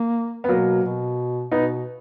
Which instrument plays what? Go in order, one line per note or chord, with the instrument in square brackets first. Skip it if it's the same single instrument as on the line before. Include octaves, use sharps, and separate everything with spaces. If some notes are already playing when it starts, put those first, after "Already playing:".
Already playing: [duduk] A#3
[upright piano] B3
[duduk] B2 [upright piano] F#3 A#3
[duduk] B2
[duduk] B2 [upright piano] B3 D#4